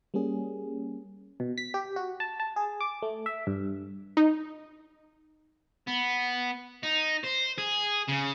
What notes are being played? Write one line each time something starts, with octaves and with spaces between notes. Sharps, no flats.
G3 A#3 C#4 G#4
B2
B6
G4
F#4
A5
A5
G#4
D6
A3
E5
G2
D#4
B3
D#4
C5
G#4
C#3